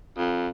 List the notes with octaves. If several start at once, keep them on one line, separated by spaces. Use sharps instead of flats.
F2